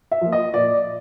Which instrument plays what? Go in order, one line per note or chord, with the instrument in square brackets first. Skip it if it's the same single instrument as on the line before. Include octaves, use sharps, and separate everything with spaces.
[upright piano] E5
F3 A#3
D#5
A#2 D5